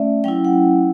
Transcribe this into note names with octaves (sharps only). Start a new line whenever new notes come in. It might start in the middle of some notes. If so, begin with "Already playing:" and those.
Already playing: A3 C#4 D5 E5
F#3 C#4 E4 G5
F#5